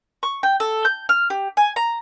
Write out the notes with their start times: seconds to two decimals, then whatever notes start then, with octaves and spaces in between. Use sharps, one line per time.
0.23 C#6
0.43 G5
0.60 A4
0.85 G6
1.09 F6
1.30 G4
1.57 G#5
1.76 A#5